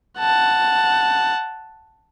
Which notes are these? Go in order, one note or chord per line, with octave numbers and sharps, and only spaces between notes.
F#5 A5